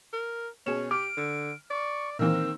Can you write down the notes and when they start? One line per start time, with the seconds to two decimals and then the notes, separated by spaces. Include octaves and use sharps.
0.13 A#4
0.66 B2 C#4 G#4 E7
0.91 G4 D6 F6 D7
1.17 D3
1.71 D5 C#6
2.19 A#2 D#3 E3 A#3 C4 A#4 E6